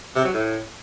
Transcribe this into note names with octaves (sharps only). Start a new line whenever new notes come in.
C3
F#3
A2